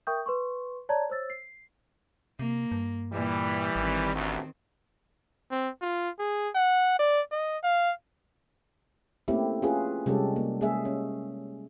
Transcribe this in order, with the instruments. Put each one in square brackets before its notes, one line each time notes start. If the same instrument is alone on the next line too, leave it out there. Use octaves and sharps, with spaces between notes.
[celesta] A#4 E5 G5 C#6 D#6 G6
B4 C6 C#6
C#5 D5 A5 A#5 G#6
C5 C#5 E6 A6
C7
[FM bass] C3 [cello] A#3
[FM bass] G2
[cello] A#2 [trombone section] E3 G3
[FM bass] G#1 [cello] D#3 C4
[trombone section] A1 D2
[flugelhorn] C4
F4
G#4
F#5
D5
D#5
F5
[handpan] A3 A#3 C4 C#4 E4 G4
C#4 F4 G#4 B4
C3 G3 G#3 C#4 G4 A4
A#3
G#3 A#3 C#4 G#4 E5
C#4